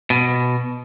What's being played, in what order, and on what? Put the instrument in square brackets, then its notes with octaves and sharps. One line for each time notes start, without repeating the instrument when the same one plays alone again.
[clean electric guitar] B2